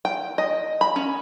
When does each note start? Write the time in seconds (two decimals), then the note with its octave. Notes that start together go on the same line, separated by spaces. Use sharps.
0.05 G5
0.38 D#5
0.81 B5
0.96 C#4